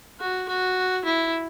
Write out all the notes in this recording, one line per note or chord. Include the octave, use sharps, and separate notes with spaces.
F#4
F#4
E4